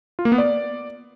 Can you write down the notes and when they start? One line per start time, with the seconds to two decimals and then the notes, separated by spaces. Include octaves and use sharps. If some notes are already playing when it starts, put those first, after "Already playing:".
0.19 F4
0.25 A#3
0.32 B3
0.38 D5